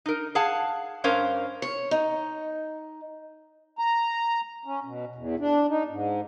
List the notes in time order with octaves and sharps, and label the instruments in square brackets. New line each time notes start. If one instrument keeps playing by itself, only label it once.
[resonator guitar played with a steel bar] D#4 A#4
G#4 F5 F#5 A5
G2 C#4 A#4 C5 F5
[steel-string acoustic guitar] C#5
D#4
[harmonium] A#5
C#4
B2
E2
D4
D#4
G#2